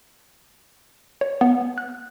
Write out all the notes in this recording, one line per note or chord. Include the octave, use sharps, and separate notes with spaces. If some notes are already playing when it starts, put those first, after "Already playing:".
C#5
B3
F#6